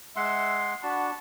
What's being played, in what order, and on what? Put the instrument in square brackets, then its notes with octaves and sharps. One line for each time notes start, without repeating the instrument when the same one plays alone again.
[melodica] G#3 F#5 C6 [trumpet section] E5
[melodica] D4 F#4 [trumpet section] F#5 A5 B5